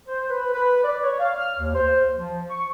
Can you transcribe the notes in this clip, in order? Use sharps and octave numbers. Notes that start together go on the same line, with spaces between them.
C5
B4
B4
D5
C#5
F5
F6
D#2
C5
F3
C#6